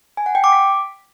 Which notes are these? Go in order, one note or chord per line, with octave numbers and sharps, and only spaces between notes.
G#5
F#5
G5
D6
B6